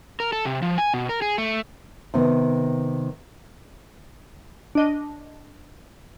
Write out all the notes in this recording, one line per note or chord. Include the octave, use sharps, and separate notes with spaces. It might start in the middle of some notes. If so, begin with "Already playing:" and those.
A#4
A4
C3
F3
G#5
B2
A#4
G#4
A3
C3 D#3 B3
D4 D#5